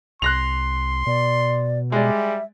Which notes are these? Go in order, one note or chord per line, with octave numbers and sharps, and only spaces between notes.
C2 C6 F#6 A#6 F7
B2 D5
G3 G#3 D5 E5